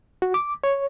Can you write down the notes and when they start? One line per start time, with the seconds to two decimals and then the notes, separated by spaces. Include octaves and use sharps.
0.22 F#4
0.34 D6
0.64 C#5